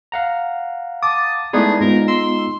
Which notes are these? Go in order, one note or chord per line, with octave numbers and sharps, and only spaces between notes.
F5 F#5 A#5
A5 D6 D#6
G#3 A3 B3 D#4 E4 G#4 D5
G#2 B3 F4 A#4
C6 E6